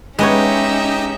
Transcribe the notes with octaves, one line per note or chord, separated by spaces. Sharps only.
G#3 B3 C#4 D#4 G4 C#5 D#5 E5